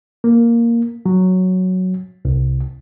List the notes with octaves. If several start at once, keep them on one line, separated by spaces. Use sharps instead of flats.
A#3
F#3
C2